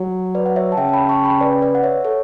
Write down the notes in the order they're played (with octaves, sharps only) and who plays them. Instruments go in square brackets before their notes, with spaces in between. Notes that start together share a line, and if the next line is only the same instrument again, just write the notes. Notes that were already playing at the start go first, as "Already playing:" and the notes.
Already playing: [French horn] F#3
[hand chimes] B4 D5
F#5
C#5 E5
A5
[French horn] C#3 [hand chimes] E5 G5
[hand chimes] A5
G5 B5
A5 C#6
G5 B5
B4 D5
B4 D5
F#5
C#5 E5
A4 C#5